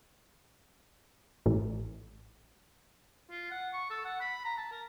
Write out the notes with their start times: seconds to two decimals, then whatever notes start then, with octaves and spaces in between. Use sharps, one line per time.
1.46 A1
3.30 F4
3.51 F#5
3.73 C#6
3.90 A4
4.05 F#5
4.21 B5
4.45 A#5
4.57 A5
4.71 A#4